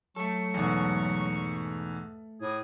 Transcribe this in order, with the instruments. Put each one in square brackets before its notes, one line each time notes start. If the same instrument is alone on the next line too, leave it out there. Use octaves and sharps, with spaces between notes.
[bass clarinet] F#3 [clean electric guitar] A3 A4 [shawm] C#6
[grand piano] E2 G#2 B2
[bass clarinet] A2 [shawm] G#4